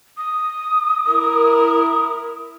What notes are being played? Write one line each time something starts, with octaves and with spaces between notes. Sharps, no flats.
D#6
E4 A#4